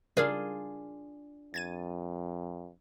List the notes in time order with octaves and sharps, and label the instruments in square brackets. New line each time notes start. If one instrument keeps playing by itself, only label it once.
[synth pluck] C#3 G3 A#4 [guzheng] D4 F4 G#4
[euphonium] F2 [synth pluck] G#6 A6 D#7